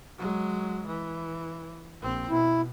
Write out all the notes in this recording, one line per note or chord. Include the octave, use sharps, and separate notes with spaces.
F#3 G#3
E3
A#1 C4
B2 E4